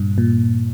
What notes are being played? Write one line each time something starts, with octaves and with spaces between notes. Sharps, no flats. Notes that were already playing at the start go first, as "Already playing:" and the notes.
Already playing: G2 A#2
A#2